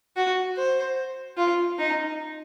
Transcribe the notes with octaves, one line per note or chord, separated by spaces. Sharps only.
F#4
C5
F4
D#4